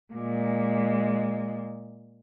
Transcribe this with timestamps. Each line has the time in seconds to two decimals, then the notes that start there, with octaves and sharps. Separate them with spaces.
0.14 A#2 G#3